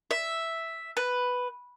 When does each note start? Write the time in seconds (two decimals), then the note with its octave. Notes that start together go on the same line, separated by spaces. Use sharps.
0.11 E5
0.97 B4